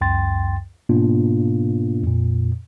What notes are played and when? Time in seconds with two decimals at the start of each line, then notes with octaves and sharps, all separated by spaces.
0.01 C#2 F#2 G5 C6 A6
0.89 G#2 B2 A#3 B3 D4 F4
2.03 F2 A#2